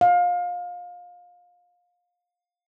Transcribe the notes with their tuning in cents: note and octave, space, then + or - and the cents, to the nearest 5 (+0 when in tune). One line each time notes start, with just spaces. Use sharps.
F5 +25